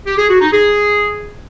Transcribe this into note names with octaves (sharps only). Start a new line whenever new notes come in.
G4
G#4
F#4
D#4
G#4